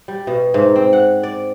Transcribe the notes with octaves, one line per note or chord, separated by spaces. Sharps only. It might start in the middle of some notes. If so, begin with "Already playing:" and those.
G3
B2
G#2
C4
F#5
D5